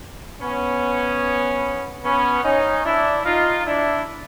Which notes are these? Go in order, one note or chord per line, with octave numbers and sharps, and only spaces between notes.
B3 C#4
B3 C#4
C#4 D#4
D4 E4
D#4 F4
D4 E4